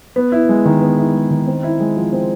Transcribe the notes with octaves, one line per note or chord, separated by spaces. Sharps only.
B3
E4
G#3
D#3
B3
E4
G#3
D#3
C4
E4
G#3
F3
C4